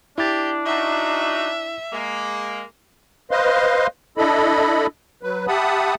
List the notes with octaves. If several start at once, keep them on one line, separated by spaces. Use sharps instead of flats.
D4 E4 G4 A6
D#4 F#4 E5
G#3 A#3
B4 C5 D#5 F5 C6
D4 E4 A4 D#5 B5
F#3 B4
G4 E5 F#5 A5 B5 D#6